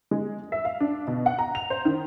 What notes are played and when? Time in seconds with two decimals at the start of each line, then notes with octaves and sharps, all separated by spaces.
0.11 G#3
0.52 E5
0.65 F5
0.80 D4
1.07 B2
1.26 F#5
1.39 A#5
1.55 F7
1.70 C5
1.85 D#3